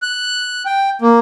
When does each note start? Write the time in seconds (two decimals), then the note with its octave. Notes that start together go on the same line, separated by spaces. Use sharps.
0.02 F#6
0.66 G5
1.02 A#3